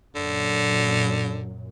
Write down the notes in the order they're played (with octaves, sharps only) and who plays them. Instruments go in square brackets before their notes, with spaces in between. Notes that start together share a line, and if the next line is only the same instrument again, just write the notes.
[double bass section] F#2 A#2 [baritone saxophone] D3